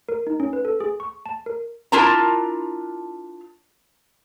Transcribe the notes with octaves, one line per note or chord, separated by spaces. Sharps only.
A#4
D#4
C#4
B4
A4
G#4
C#6
A5
A#4
D4 E4 F4 A#4 A5 A#5